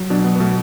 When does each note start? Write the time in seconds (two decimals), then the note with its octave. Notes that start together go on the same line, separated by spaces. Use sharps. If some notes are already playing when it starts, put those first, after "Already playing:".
Already playing: F#3
0.10 B2 D4
0.24 B3
0.35 B3
0.40 B2 A3